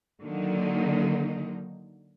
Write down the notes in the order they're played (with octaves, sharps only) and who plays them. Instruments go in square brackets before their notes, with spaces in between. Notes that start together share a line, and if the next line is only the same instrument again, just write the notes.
[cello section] D3 D#3 F#3 A#3 D#4